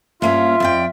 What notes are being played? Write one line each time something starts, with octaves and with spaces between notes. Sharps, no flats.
G2 A#3 C#4 F4 E5
F2 D5 G5